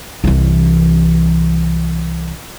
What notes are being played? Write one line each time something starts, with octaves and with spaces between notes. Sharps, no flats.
C2 E3